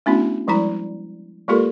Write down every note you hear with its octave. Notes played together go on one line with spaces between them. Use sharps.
A3 B3 C#4 D4 E4 F#4
F3 G3 G#3 E4 A#5
G#3 A#3 F4 G4 A4 A#4